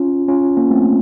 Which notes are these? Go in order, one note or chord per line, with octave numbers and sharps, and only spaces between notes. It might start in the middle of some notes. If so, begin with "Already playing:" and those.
Already playing: C#4 F4
C#4 F4
A#3 C#4
A3 C4